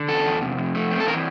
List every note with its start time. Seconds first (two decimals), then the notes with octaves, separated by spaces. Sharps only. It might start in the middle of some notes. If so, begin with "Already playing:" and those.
Already playing: D3
0.09 E2 A4
0.26 E2
0.42 C3
0.58 F2
0.75 A3
0.91 C4
1.00 A4
1.07 E3 A#4